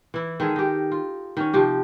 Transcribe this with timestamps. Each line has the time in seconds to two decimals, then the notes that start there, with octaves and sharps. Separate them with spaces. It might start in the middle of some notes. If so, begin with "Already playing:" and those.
0.14 E3 E4
0.40 D#3 G#3 G#4 A4
0.56 D#4 G4
0.91 F4
1.37 D#3 C#4
1.53 C3 F3 G4